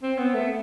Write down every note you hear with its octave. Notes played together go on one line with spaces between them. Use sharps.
C4
B3
A3